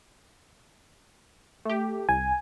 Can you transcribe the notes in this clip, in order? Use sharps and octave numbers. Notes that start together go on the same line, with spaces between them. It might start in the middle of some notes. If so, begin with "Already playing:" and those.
A3 G4
C2 G#5